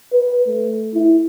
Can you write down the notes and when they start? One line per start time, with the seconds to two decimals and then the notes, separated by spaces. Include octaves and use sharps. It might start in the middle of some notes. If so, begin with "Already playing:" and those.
0.12 B4
0.47 A3
0.94 E4